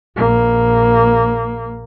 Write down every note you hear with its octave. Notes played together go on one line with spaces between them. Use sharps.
A#1 A#3